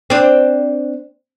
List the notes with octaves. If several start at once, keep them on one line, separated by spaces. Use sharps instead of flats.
C4 D4